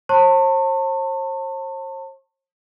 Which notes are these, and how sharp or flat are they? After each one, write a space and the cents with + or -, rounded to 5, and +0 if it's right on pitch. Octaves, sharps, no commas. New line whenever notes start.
C5 +45 A5 +35 C#6 -40